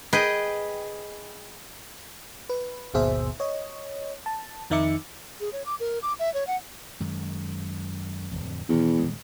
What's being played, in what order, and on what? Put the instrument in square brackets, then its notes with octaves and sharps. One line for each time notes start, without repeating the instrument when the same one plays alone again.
[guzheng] G#4 B4 D#5 G5
[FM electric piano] B4
G#1 D#2 B2 G#4 C5 E5
C#5 D#5
A5
F2 D#3 D#4 E5 D6 C#7
[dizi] G#4
C#5
D6
A#4
D6
E5
C#5
F#5
[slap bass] F#2 D#3 G#3
D1 B1 F2
[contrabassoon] E2 [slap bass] B2 D#3
[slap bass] D#1 G#3